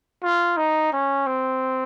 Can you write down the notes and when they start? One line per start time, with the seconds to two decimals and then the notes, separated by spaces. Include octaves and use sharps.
0.23 F4
0.57 D#4
0.93 C#4
1.26 C4